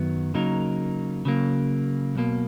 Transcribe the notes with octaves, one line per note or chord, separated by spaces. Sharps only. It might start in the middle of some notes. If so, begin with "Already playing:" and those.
Already playing: F#2 D#3 F#3 B3
C#3 F#3 A#3 D#4 A#4
C#3 F#3 A#3
B1 B2 A#3